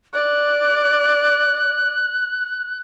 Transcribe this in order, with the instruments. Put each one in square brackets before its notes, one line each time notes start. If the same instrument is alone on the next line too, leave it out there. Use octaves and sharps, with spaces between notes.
[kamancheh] D5 [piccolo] F#6